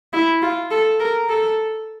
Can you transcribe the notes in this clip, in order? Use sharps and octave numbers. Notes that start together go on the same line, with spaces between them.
E4
F4
A4
A#4
A4